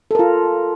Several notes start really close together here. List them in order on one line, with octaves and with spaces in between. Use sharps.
A4 A#4 F4